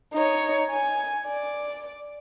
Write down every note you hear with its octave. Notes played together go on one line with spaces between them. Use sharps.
D#4 C#5
G#5
D5